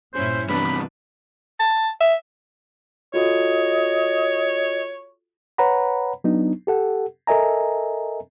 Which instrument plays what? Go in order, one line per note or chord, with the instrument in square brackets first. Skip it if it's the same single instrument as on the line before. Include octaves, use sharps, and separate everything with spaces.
[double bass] G2 A#2 [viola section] C#4 E4 [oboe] C5
[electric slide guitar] G2 C3 B3 [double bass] E3 [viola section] D4 B4 [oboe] B5
[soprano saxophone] A5
E5
[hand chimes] F4 F#4 A4 [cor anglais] C#5 [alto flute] D#5
[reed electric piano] B4 C#5 F#5 A#5 B5
F#3 B3 D4 D#4
G4 A4 F#5
A4 A#4 D#5 E5 G#5 A#5